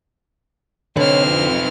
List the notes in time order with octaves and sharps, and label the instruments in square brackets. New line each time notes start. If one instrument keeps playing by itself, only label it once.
[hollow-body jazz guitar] D3 [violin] C4 F6 [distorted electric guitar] D#4 B4 [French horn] C#5
[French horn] F2